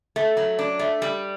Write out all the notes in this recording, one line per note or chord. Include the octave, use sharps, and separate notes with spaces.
A3
F#3
D4
A3
G3